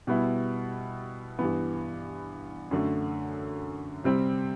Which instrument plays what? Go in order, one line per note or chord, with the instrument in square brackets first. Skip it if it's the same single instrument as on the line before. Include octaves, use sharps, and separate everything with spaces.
[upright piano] B2 G3 B3 E4
G2 E3 B3
F#2 D3 A3
C3 G3 C4